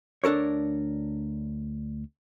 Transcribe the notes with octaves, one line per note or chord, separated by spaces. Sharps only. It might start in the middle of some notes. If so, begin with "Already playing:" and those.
D2 D4 A4 A#4 C#5